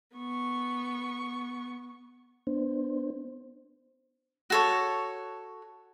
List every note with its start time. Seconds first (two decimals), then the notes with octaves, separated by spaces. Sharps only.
0.16 B3 C#6
2.47 B3 D4 C5
4.50 F#4 A4 C#5